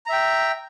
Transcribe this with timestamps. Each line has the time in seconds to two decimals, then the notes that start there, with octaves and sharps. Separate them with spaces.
0.06 A#5
0.09 E5
0.13 G5